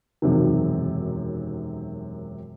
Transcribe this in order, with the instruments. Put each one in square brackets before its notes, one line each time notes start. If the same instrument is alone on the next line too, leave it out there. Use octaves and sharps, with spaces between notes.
[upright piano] E1 F#2 C3 D#3